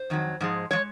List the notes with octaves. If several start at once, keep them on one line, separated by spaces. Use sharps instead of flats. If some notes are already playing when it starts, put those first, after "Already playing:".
Already playing: C5
F2 D#3 F#3
G#2 F3 G#3
F3 G#3 C#5